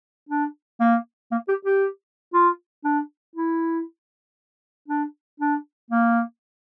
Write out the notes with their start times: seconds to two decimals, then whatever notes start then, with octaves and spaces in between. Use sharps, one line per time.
0.29 D4
0.80 A#3
1.31 A#3
1.48 G4
1.65 G4
2.34 F4
2.84 D4
3.35 E4
4.88 D4
5.40 D4
5.90 A#3